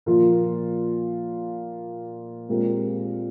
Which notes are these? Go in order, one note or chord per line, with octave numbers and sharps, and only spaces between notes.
A#2 F3 A#3 F4
A#2 G#3 C4 G4 A#4